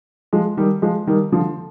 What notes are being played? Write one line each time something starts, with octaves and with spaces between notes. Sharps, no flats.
F3 G#3
D#3 G3
F3 G#3
D#3 G3
D3 F3